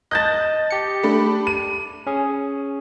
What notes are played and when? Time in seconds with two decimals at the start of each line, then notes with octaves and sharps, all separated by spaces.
0.11 D#5 A5 F#6 G6 A6
0.71 G4 C#7
1.03 A3 D4 B5
1.47 D#7
2.07 C#4 G#4